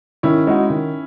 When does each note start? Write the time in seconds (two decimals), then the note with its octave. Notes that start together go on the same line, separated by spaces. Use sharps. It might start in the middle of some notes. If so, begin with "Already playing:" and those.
0.23 D#3 C#4 E4
0.47 G#3 D#4 F#4
0.70 D#3